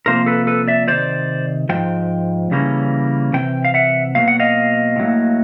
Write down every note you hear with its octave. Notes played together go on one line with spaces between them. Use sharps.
C3 F3 A#3 A#4 C5
A4 B4
A4 B4
D5 E5
C3 D#3 C5 D5
G#2 F3 G5
C#3 E3 G3 A#3 C#4
C3 E3 G5
F5
E5 F#5
B2 F#3 A#3 F5
F#5
D#5 F5
A2 F#3 A#3